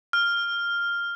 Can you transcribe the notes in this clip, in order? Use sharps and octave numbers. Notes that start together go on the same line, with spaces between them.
F6